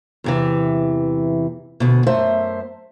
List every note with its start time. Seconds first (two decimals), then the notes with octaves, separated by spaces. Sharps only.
0.24 E2 C3 E3
1.80 D2 B2
2.07 F#2 A3 C5 E5